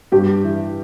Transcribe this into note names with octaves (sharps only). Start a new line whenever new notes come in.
G2 G4
E3